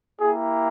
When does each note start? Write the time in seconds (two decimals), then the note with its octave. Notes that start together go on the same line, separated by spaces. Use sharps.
0.21 A#3 E4 G4 G#4